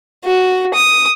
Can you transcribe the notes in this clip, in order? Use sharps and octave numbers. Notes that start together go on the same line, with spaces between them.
F#4
D#6